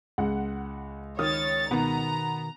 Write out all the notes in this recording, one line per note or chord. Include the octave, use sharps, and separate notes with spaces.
C#2 F#5
D#3 C#5 D#6 F6 A6
B2 D#3 B3 A#5